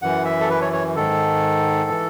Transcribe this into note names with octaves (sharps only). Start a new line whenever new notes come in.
F#2 E3 F#5
E5
A4
B4
C#5
C#5
G#2 D#3 A4
E3